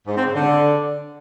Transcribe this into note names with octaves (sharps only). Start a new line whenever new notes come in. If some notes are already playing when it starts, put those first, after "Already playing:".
G#2
C4
C#3
D3